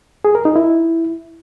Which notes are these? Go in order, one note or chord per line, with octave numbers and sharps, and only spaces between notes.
G#4
A#4
D#4
E4